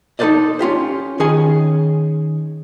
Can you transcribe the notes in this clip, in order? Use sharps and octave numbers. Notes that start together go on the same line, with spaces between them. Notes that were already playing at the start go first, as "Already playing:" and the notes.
D#4 A4 B4 C5 D5 D#5
C#4 F4 G4 C5
D#3 C#4 G#4 D#5 G#5